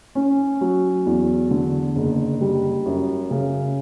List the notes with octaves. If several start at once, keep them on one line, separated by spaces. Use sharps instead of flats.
C#4
F#3
E2
D3
F#1
G3
F#2
C#3